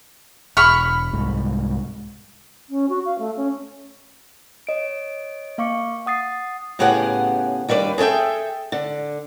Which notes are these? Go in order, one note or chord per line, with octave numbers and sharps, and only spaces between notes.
E1 B5 C#6 F6
C2 G#2
C#4
F#4
F5
A3
C#4
C#5 D#5 D7
A#3 F5 C#6 D6 C#7
F#5 D#6 A6 C7
A2 C#3 B3 G4 G#4 F#5
D#2 G3 D4 B4 D5
G#4 A4 B4 E5 G5
D3